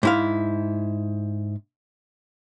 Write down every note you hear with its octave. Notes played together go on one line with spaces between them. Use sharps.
G#2 E4 F5